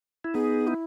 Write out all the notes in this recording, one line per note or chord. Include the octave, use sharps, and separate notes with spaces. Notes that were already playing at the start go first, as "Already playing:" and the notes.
E4
B3 D#4 G#4
E4